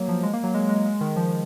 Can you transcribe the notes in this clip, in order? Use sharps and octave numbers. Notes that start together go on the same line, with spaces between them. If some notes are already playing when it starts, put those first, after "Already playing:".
Already playing: F#3 A#3
F3
G#3
A#3
F#3
G#3
G#3
G#3
D#3
F3